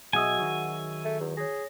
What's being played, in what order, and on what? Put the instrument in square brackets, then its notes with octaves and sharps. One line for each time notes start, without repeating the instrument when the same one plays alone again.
[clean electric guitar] B1 F#3 D#5 [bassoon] F#4 [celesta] G#4 E5 E6 [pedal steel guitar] G#5
[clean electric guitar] D#3 F#3
[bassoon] A3
E2
[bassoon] G#4 [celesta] C#5 A#6